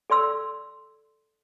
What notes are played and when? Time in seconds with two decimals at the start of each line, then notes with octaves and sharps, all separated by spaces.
0.10 A4 D5 C6 E6